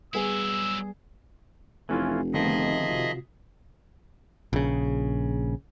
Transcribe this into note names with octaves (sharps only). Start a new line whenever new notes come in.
F#3 G3 B3 E4 G#4 E6
F1 E3 C#4 E4 F4 A4
D3 D#3 F3 A3 B3 G#4 D#5 E5
C3 F4 F#4
A#1 C#3